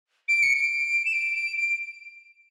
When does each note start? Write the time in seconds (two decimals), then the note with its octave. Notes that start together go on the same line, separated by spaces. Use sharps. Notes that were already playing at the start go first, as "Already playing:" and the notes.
0.28 D7
0.42 C#7
0.55 D7
1.05 E7
1.13 D7
1.34 D7
1.56 D7